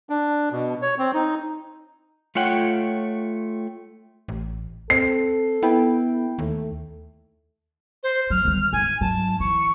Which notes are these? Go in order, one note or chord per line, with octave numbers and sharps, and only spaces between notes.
D4
B2
C#5
C4
D#4
A3 F4 C#5 F#5 G5
A1
C4 A4 C7
B3 E4 G5
D#2 A3
C5
F#3 F6
D#3 G3
G#2 G#5
G#2 F#3 A5
E3 C#6